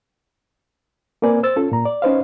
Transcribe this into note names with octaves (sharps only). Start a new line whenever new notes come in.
A#3 C4 A#4 B4 D5 G#5
C5 E6 A6
C#4 F4 A4
A#2 A#5
D5
C#4 D#4 B4 C5 D#5 F5